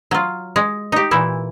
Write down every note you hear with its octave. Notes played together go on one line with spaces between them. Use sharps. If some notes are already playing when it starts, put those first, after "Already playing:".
F#3 F4
G#3
D#4 G4
A#2 E3 E4